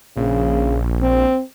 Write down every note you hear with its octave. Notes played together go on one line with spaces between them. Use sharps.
A#1 C#3
C4